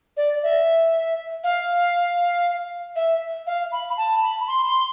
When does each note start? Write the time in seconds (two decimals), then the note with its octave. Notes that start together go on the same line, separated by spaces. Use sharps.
0.17 D5
0.43 E5
1.44 F5
2.96 E5
3.47 F5
3.72 B5
3.97 A5
4.23 B5
4.48 C6
4.67 C6